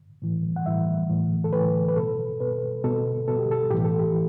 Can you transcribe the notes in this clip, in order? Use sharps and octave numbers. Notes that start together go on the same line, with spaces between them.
A2 E3
F#5
A2 E3 E5
A2 E3
A4
A2 E3 B4
B4
B2 A4
B2 B4
B2 A4
B2 A4
G4
A4
A2 E3 G4
A4
G4
E3